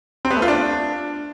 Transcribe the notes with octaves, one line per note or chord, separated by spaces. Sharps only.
C4
B3
A3
F4
D4